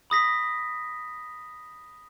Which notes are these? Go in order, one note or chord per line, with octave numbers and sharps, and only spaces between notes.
B5 D#6 A#6 B6